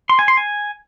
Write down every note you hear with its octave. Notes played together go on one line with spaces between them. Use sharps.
C6
G#5
C6
G#5